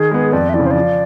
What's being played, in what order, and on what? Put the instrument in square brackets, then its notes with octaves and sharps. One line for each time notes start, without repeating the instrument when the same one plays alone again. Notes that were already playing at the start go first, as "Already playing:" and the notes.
Already playing: [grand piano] D#3 [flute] G#4
[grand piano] G#3 B3
[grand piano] F2 [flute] D5
[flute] E5
[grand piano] E3 [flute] D5
[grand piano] C#3
[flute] C5
[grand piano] F3 [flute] D5